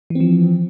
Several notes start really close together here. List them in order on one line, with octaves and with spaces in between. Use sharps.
E3 C4 F3